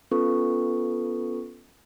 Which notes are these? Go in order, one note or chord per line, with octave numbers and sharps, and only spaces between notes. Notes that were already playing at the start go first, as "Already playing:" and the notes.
B3 C#4 F4 A4 B4 C#6